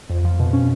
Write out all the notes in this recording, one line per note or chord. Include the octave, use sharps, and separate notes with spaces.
F2
F3
B2
C#4